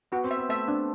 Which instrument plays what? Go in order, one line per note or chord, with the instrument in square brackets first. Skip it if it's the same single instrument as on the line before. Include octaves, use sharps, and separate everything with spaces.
[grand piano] B3 [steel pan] F#4
[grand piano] C4
[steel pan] E5
[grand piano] B3
[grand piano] A3 [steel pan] E5
[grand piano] C4 [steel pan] D4